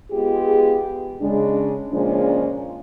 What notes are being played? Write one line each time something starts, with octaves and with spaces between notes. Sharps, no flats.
G#3 B3 F4 G4 G#4
C#3 G#3 D4
A#2 C#3 F3 G#3 C#4 D4